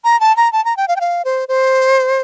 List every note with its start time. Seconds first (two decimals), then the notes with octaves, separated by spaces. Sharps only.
0.04 A#5
0.20 A5
0.37 A#5
0.53 A5
0.65 A#5
0.77 G5
0.88 F5
0.96 G5
1.01 F5
1.25 C5
1.48 C5